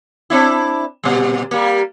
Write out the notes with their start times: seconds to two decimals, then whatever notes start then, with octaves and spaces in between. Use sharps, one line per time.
0.30 C4 D4 E4
1.03 A#2 G3
1.51 G3 A#3